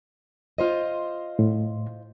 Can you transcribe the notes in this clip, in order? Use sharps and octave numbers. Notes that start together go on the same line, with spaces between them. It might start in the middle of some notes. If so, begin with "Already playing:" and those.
F4 C5 D#5
A2